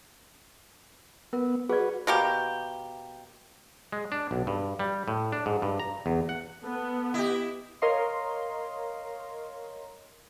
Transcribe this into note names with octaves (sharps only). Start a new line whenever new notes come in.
B3 A#4
F#4 G#4 B4 D5
B2 A#3 G4
G#3
D4
B1
G2
G3
A2
D4
G#2
G2
A#5
E2
F#5
B3 A4
E4 G4 D#5
A#4 C#5 D#5 F5 C6